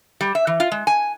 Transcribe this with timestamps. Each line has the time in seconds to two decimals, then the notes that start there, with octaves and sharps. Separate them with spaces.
0.21 G3
0.35 E5
0.47 E3
0.60 F4
0.72 G#3
0.87 G#5